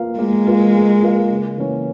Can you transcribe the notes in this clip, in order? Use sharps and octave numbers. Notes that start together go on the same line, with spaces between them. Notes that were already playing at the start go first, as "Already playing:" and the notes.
Already playing: A#3 F4 A#4 F5
G#3 A#3
F4 A#4 F5
A#3
F4 A#4 F5
C#3
E3 A#3 C#4